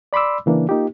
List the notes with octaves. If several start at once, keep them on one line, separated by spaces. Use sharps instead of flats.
D5 B5 C6 D6 E6
C#3 E3 A#3 D4
A#3 D#4 F4 G4